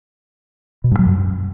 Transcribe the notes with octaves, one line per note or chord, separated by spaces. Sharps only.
B2
G2
F#3
F#2